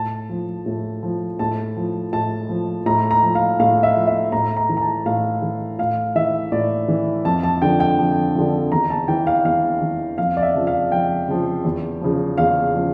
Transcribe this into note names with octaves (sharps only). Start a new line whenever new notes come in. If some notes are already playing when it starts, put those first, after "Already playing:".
Already playing: A2 A5
F3
A2
F3
A2 A5
F3
A2 A5
F3
A2 A#5
A#5
F3
F5
A2 F5
E5
F3
E5
A2 A#5
A#5
E3
A#5
A5
A2 F5
E3
A2 F5
E3 E5
A2 D5
E3
F2 A5
A5
D3 F3 G5
G5
F2
D3 F3
E2 A#5
A5
E3 G5
F5
E2 F5
E3
F2 F5
D5
E5
C#3 F3
F5
F2 G5
C#3 F3
E2
C#3 F3
E2 F5
C#3 F3